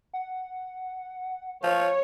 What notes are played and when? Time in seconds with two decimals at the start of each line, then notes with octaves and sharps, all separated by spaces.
0.13 F#5
1.63 F3 C#5